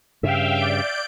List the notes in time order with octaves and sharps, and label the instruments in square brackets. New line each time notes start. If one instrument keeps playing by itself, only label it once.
[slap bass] G2 C#3 [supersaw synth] E5 F5 G5
[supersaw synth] D5 G6 D7